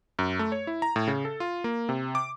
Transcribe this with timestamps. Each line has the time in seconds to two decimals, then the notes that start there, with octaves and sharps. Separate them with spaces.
0.19 F#2
0.39 A3
0.52 C#5
0.67 E4
0.82 A#5
0.96 A2
1.08 C#3
1.25 A4
1.40 F4
1.64 A#3
1.89 C3
2.15 D6